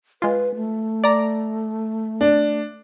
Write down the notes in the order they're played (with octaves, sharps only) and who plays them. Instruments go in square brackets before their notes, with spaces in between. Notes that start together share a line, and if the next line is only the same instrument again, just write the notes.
[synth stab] G#3 F4 [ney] B4
[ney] A3
[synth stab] D5 A#5
[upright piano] D4